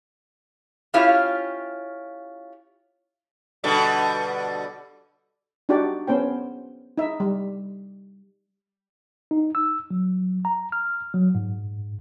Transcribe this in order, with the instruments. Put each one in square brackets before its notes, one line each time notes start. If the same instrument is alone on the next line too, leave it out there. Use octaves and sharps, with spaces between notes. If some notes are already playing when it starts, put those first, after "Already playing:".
[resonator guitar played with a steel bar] C#4 E4 F4 G4 C#5 F5
[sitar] B2 D3 G3
[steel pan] D4 D#4 F#4 G4 D5
B3 C#4 C5 G5
D#4 E5
G3
[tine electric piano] D#4
E6
F#3
A#5
F6
F#3
G#2